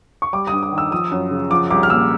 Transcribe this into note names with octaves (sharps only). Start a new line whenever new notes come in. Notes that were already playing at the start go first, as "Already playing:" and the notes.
C#6
G3 D6
G2 D#6
D#6
D#3
E6
F3 D#6
F#2
C#3
F3 D6
C2 D6
F6
A#2 E6